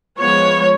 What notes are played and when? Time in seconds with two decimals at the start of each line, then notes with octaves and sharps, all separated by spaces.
0.19 F3 G#3 B3 C#5